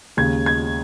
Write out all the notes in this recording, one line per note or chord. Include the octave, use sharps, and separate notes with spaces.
D#2 C#3 G#3 G#6
G#6